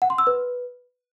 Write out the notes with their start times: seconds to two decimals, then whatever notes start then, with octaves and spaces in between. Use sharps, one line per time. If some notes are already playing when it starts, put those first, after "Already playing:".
0.02 F#5
0.10 C6
0.18 E6
0.27 B4